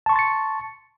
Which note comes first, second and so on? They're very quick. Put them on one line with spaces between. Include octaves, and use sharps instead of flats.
A5 C#6 C6 A6 C#7